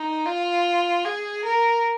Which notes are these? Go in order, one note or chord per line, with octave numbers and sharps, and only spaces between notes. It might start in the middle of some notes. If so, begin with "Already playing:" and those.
Already playing: D#4
F4
G#4
A#4